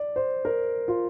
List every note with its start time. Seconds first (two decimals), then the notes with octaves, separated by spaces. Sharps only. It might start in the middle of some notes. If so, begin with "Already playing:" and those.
Already playing: D5
0.16 C5
0.45 A#4
0.88 F4